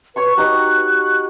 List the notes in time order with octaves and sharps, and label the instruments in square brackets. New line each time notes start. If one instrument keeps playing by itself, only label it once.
[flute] B4 [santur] C#5 B5 C#6
[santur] D#4 F#4 G4 [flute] F#6